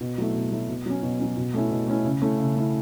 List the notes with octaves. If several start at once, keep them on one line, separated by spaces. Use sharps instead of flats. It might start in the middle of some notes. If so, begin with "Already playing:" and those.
B2
F#3 A3 E4
B2
F#3 A3 E4
B2
F#3 C#4
B2
F#3 C#4
B2
A3 C#4 E4
B2
A3 C#4 E4
C#3
A3 C#4 E4
C#3
A3 C#4 E4